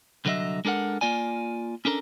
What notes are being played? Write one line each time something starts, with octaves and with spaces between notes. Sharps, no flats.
C2 D3 F#3 A#4 D#5 E5
G#3 D4 A4 A#4 F#5
A#3 F4 D5 G#5
C#4 D4 A4 A#4